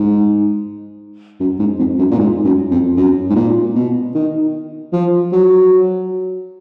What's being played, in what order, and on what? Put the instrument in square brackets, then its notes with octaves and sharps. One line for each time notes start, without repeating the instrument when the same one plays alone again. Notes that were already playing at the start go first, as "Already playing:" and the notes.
Already playing: [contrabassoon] G#2
F#2
G#2
F2
F#2
A#2
G#2
F#2
F2
F#2
G#2
A#2
B2
D#3
F3
F#3